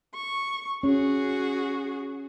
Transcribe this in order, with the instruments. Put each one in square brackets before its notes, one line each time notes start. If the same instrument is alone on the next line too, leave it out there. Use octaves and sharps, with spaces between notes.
[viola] C#6
[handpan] C#4 [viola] F#4 G#4